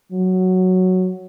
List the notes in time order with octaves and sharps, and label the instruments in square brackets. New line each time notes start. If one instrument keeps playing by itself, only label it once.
[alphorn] F#3